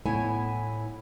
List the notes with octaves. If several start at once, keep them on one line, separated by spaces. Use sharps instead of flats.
A2 B3 E4 C#5 E5 G#5